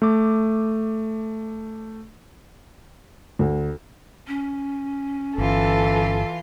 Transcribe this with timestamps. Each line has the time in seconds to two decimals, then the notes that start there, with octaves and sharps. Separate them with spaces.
0.02 A3 D6
3.39 D2
4.27 C#4
5.38 G1 E3 F4 A4